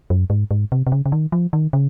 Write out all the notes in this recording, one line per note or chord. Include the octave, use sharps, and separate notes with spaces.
F#2
G#2
G#2
C3
C3
C#3
C#3
D#3
F3
D#3
C#3